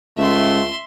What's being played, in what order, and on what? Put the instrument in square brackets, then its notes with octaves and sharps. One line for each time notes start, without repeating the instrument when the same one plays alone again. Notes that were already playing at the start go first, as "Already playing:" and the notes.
[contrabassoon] C#2 [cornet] A3 [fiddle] E5 C6